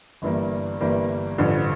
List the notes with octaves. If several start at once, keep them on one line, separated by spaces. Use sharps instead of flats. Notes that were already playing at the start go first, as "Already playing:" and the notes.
G1 G2 E3 G3 A#3
G1 G2 E3 G3 A#3
A1 G2 D3 F3